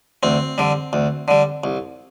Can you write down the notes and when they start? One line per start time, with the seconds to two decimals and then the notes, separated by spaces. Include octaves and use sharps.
0.23 D2 C4
0.58 D3 G3
0.93 D2
1.28 D3 G3
1.64 C2